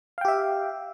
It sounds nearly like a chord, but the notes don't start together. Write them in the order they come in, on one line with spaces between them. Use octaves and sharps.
F5 G5 G4 E5